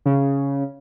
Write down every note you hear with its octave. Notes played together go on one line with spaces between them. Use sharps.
C#3